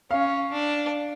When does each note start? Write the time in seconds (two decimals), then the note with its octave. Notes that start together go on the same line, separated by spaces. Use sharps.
0.11 C#4 F5
0.52 D4